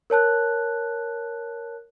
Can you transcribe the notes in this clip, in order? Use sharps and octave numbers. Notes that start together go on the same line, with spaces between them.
A#4 C#5 A5 F#6